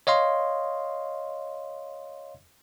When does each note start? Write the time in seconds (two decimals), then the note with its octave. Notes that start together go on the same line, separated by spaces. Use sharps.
0.07 C#5 D#5 F5 C6